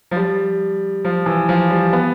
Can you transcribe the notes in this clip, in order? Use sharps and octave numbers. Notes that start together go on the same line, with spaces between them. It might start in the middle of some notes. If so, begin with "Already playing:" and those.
F3
G3
F3
E3
F3
G3
B3